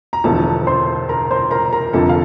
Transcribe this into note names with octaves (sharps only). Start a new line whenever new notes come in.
A#5
E1 E2 D3 F3 A4 A5
C5 C6
A#4 A#5
C5 C6
A#4 A#5
A#4 A#5
F1 F2 D3 F3 A4 A5
F5